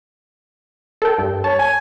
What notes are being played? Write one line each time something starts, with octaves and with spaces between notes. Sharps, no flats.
A4 A#4 G5
G2
C#5 A5
G#5